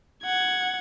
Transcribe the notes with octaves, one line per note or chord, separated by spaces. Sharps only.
F#5 G#6